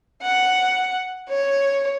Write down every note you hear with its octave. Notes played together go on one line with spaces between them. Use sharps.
F#5
C#5